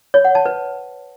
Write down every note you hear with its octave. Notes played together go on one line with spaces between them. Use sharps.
C#5
F#5
A5
B4